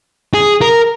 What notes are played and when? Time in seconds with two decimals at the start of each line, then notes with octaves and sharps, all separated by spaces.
0.34 G#4
0.61 A#4